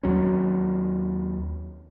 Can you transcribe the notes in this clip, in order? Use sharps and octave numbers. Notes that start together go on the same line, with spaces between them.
D#2 F#3 C#4